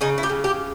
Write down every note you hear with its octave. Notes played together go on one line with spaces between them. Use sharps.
C#3 D#4
E4
G4
C#3
G4